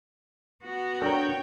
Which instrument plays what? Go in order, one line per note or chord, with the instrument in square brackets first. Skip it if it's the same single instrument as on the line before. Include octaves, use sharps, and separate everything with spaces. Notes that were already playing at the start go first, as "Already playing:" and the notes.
[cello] B3 F#4
[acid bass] D4 [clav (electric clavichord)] A4 A#4 [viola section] C#5 G5